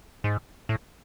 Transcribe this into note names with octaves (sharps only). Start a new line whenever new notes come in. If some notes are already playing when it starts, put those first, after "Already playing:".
G#2
A2